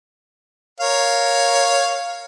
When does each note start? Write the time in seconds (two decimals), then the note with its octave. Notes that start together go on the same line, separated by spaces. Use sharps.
0.80 A#4 C#5 F5